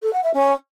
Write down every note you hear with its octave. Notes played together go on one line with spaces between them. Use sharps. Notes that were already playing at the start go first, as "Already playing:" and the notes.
A4
F#5
E5
C#4